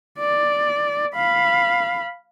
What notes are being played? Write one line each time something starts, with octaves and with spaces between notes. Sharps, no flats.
D5
F5 B5